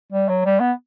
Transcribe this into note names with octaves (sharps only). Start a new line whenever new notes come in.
G3
F#3
G3
B3